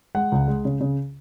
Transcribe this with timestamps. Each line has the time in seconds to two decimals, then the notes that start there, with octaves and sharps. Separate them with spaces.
0.15 G#3 F#5
0.32 C#2
0.48 G#3
0.65 C#3
0.81 C#3